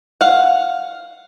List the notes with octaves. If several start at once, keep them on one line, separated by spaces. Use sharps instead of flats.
F5 F#5